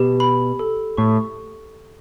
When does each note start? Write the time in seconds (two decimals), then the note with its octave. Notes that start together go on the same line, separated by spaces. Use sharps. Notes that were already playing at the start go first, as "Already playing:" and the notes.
Already playing: B2 G4
0.20 B5
0.59 A4
0.97 A2 C#6